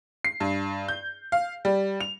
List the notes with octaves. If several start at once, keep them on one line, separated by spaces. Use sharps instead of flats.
C7
G2
G6
F5
G3
F7